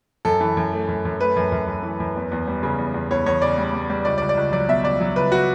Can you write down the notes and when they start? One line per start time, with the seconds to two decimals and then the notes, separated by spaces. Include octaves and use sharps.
0.25 F#2 A4
0.41 E3
0.57 F#2
0.73 A3
0.88 F#2
1.05 F#2
1.20 A3 B4
1.36 F#2
1.52 F#2
1.68 F#2
1.83 E3
2.00 F#2
2.16 E2
2.31 E2
2.47 G3
2.63 C#3
2.78 E2
2.94 E2
3.11 E2 C#5
3.26 E2 C#5
3.42 C#3 D5
3.58 G3
3.74 G3
3.90 G3
4.05 C#2 D5
4.18 D5
4.22 C#2
4.29 D5
4.37 C#2
4.52 F#3 D5
4.69 B2 E5
4.84 C#2 D5
5.01 F#3
5.16 C#2 B4
5.32 F#4